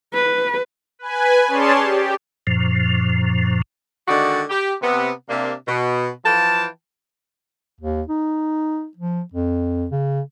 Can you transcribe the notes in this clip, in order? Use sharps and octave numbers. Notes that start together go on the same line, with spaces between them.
B4
B4 G#5
C#4 G#4 C#5 D5 A5 C6
G4
F#2 A#2 F3
D3 D#3 G#3 D#4 F#4 D5
G4
C3 B3
C3 A#3 D4
B2
E3 F3 F5 G5 A5
D#2
D#4
F3
F2
C#3